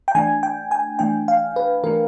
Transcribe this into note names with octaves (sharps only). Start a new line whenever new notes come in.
G5
E3 A3 D4 G#5
G5
G#5
E3 A3 D4 G5
F5
B4
E3 A3 D4 A#4